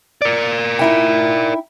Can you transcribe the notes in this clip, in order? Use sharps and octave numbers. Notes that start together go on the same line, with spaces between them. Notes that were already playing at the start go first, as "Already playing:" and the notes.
A#4 D5
D#4 E4 G5